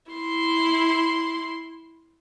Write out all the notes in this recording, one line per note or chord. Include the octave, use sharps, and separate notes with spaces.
E4 C6